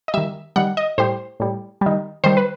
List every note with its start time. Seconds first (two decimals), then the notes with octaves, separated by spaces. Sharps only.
0.08 D#5
0.14 D#3 G3 E5
0.56 D#3 G3 F#5
0.77 D#5
0.98 A2 G3 C5
1.40 A2 G3
1.81 D#3 G3
2.24 D#3 G3 C5
2.37 B4